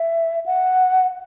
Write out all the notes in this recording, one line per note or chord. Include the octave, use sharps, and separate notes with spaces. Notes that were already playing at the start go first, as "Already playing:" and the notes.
Already playing: E5
F#5